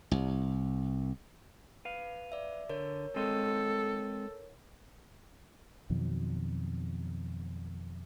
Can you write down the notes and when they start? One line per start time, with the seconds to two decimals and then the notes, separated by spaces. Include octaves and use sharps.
0.11 C2
1.85 B4 F5
2.32 D5 E5
2.69 D3 A#4 C#5
3.16 G#3 C4 A4 D#5
5.90 F2 B2 D#3 F#3